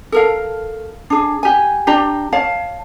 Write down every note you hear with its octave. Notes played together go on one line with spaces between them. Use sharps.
A4 A#4 F5
D4 G#4
G4 G#5
D4 G4 D5 A#5
C#5 F5 A5